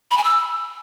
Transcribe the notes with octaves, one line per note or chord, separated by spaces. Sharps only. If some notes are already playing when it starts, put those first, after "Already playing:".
B5
G#5
E6